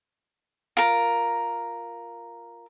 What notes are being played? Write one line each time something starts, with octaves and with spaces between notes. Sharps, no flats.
F4 A#4